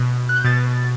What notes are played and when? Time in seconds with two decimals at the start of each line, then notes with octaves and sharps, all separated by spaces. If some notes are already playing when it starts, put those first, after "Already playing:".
Already playing: B2
0.29 F#6
0.36 G6
0.44 B2 A6